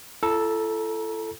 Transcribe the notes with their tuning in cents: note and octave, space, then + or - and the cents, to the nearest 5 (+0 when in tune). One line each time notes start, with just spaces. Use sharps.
E4 +45 A4 +0 A#5 +40